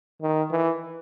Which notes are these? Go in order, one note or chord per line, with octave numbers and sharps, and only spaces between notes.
D#3
E3